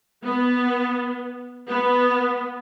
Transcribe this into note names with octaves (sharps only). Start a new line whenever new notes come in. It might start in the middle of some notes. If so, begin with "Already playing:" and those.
B3
B3